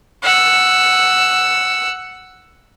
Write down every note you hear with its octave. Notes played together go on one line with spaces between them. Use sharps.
F#5 E6